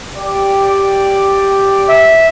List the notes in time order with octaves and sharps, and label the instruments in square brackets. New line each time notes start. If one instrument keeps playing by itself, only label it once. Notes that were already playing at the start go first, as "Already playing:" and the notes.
[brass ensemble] G4 D5
[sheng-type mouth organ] E5